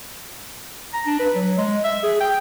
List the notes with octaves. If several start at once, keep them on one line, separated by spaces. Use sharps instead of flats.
A#5
D4
B4
F#3
G#3
E5
G#4
G5